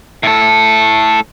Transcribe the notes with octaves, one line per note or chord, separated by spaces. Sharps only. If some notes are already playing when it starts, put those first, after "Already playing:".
A2 A4